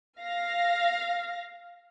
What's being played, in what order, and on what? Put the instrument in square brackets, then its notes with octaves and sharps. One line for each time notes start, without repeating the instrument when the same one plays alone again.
[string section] F5 A#6